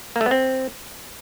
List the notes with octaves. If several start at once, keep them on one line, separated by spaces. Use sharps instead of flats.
A#3
A3
B3
C4